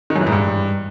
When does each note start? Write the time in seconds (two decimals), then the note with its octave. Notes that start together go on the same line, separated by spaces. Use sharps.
0.10 D#3
0.16 F#2
0.21 E3
0.27 G#2
0.32 G2